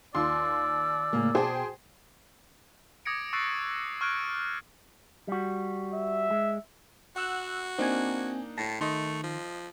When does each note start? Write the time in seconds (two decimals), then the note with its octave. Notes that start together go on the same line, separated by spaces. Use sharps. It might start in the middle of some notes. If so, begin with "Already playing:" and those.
0.15 D#2 F4 D5 C6 E6
1.13 A2 C#3 A#3
1.35 B2 G#4 C5 E5 G5 A5
3.05 D6 D#6 G#6 A#6 C#7 D7
3.33 C#6 E6 F#6 A6 C7 D7
4.01 C#6 F6 F#6 G#6 D7
5.28 G3 F#4
5.94 E5
6.31 G#3
7.16 F#4 F#5 E6 F#6
7.78 A#3 C4 D4 D#4 G#5
8.58 A2 A5 A#6
8.81 D#3 A3 D#5 C6
9.23 F3